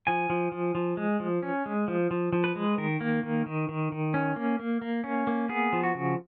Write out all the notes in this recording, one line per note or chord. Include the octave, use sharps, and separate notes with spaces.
F3 G#5
F3
F3
F3
G#3
F3
C#4
G#3
F3
F3
F3
B4
G#3
D#3 A#4
A#3
D#3
D#3
D#3
D#3
C#4
A#3
A#3
A#3
C#4
A#3
B3 G#4
F3
F#4
C#3